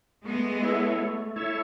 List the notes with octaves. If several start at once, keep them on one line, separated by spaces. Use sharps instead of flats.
G#3 A3 B3
E4 A4 C#5 E5
A3
E4 A4 C#5 E5